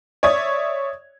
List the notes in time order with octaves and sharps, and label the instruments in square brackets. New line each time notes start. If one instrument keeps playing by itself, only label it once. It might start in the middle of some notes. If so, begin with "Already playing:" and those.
[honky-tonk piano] C#5 D5 E5 D#6 G#6